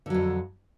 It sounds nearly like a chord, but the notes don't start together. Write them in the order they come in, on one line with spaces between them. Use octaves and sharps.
D3 F#3 F2